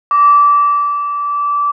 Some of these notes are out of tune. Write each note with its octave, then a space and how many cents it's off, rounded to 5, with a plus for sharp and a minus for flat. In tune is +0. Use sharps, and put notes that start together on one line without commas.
D6 -20